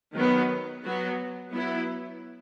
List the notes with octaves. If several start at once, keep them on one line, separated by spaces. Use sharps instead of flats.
D#3 F#3 B3
F#3 B3 F#4
F#3 B3 E4